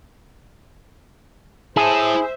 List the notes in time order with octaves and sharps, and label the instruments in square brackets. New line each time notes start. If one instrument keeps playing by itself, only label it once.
[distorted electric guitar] E4 A5 [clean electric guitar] G#4 [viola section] C5 E5